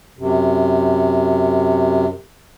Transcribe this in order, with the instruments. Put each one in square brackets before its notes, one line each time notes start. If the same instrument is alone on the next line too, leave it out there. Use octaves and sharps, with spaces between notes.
[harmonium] F#2 C3